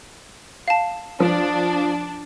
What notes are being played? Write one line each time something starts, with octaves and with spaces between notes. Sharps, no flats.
F5 A5
F3 D4